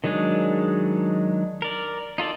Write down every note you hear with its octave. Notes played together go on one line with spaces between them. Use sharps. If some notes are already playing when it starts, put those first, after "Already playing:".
D#3 F#3 G#3 D4 G#4
A#4 D5
D#4 F4 A4 D5